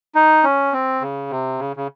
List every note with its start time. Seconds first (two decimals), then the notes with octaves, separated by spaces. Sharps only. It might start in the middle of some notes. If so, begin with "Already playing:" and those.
0.15 D#4
0.43 C#4
0.73 C4
1.01 C#3
1.30 C3
1.59 C#3
1.76 C#3